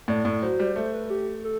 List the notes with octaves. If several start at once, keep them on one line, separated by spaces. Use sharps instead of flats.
A2 D5
A2
F#3 C5
G3
A3 C5
B4
G4
A4